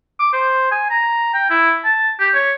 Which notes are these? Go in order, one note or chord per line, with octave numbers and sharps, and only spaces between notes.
D6
C5
G#5
A#5
G5
E4
A5
G4
C#5